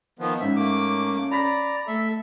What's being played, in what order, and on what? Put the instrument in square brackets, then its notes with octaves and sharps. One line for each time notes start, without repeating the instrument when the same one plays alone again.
[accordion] D#3 F3 B3
[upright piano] G#2 [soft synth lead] C#4 [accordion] E5
[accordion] A3 A#3 D6
[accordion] D5 A#5 [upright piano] B5 B6
[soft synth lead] A3 [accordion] A4 E5